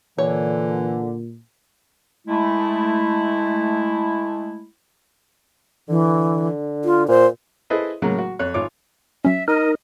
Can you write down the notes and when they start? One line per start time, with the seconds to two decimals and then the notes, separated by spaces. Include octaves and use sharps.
0.18 A#2 D3 E3 C#5
2.28 G#3 A3 E4
5.89 D3 E3
6.85 F4
7.08 A#2 C5
7.70 E4 G#4 A4 B4 C5 D#5
8.02 A2 C#3 F#3 G#3 A#3
8.19 F#4
8.39 F2 C#5 F#6
8.54 G#1 F4 C#5 D6
9.25 F#3 C#4 E5
9.48 D#4 A#4 D#5